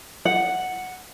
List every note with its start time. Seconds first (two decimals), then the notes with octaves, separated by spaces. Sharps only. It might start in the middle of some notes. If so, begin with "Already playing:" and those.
0.25 F#5